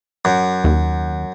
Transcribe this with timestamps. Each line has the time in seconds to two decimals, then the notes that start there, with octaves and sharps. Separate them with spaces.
0.25 F#2
0.64 D#2